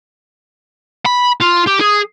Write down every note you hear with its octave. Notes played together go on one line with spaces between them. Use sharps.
B5
F4
G4
G#4